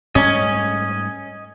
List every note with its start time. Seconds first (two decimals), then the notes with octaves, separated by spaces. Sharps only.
0.15 G#2 G3 A3 C#4 D#5 G#5